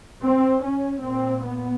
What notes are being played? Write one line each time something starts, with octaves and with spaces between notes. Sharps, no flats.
C4
C#4
A#2 C4
B3